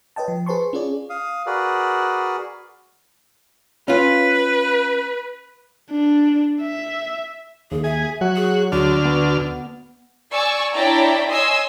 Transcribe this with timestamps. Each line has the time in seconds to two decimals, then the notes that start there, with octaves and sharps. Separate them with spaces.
0.16 B4 C#5 D#5 G5 A5
0.28 F3
0.46 G#4 B4 C5 A5 C6 C#6
0.73 C#4 F4 G#4 C#5 D5
1.10 F5 D#6
1.46 F#4 G#4 A#4 B4 D5
3.88 C#4 F4 B4
5.91 D4
6.62 E5
7.71 D#2 G#4
7.84 G#4 E5
8.21 F#3 F#4
8.36 G#4
8.72 D2 D3 F#4 F6
9.05 B3
10.33 D5 G#5 C#6 E6
10.75 D4 E4 C#5 D5 G5 A#5
11.31 C#5 D#5 G#5 C6 D#6 E6